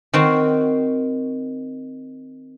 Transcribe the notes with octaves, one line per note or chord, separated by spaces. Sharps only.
D#3 C4 F#4